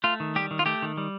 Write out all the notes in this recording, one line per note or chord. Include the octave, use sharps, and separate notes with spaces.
A3 F4
D#3
G3 G4
D#3
F4
A3 G4
D#3
G3